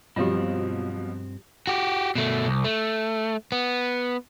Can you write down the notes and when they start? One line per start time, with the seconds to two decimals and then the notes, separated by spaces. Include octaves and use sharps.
0.16 G2 B2 F3 F#3 C4 F4 G4
1.67 F#4 G4
2.15 B2 A3
2.46 C2
2.65 A3
3.52 B3